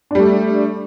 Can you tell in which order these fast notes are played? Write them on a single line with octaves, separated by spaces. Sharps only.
D4 G3 A3